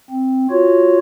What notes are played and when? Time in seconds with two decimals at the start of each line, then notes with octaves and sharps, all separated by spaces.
0.10 C4
0.51 F4 F#4 C#5